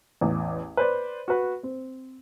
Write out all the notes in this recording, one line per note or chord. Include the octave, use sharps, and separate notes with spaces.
A1 E2
B4 C5 D5
F#4 B4
C4